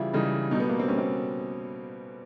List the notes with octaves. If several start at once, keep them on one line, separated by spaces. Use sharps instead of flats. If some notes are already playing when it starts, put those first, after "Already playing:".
Already playing: C#3 E3 G3 E4 F4
C#3 E3 G3 D#4
B2 G3 D#4
B3
A#3
C4
B2 G3 C#4
C4